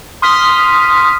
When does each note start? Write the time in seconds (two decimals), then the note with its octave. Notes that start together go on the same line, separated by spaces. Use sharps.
0.22 C6 D#6 F6 B6